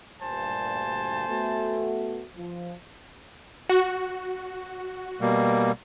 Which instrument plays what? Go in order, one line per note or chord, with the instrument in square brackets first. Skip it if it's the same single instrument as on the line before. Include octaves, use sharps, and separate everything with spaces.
[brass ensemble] D2 G2 A#2 [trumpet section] C5 G#5 A5
[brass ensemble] A3 B3 F#4
F3
[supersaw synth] F#4
[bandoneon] B2 G3 A#3